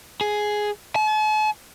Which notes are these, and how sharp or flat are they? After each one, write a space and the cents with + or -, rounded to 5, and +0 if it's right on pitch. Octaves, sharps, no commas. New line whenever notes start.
G#4 +5
A5 -45